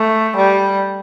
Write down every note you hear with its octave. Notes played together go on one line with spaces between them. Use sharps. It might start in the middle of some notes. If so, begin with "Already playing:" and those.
Already playing: A3
G3